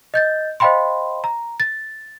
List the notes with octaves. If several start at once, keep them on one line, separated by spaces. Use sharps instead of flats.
D#5 G6 A6
C5 D#5 F5 G5 B5 C6
A#5
A6